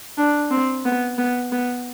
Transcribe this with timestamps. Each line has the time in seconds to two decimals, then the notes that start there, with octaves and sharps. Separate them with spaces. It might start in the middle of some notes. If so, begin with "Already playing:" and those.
0.18 D4
0.51 C4
0.85 B3
1.18 B3
1.52 B3